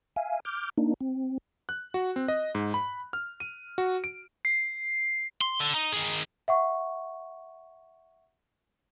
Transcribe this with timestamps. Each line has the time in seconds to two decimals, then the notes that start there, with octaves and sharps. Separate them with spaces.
0.16 E5 F5 G#5
0.45 D6 F6 G6
0.78 A#3 D4 D#4
1.01 C4
1.69 F#6
1.94 F#4
2.16 C4
2.28 D#5
2.55 G#2
2.74 B5
3.13 F6
3.40 D#7
3.78 F#4
4.04 D7
4.45 C7
5.41 C6
5.60 D3
5.75 D#4
5.93 D#3 G#4
6.48 E5 F#5 C#6